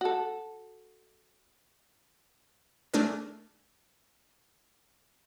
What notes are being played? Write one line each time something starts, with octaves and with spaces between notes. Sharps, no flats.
F#4 A4
A3 D4 G#4 A#4